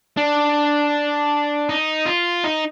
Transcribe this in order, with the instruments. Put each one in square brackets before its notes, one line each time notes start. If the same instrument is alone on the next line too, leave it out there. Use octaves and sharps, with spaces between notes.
[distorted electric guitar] D4
D#4
F4
D#4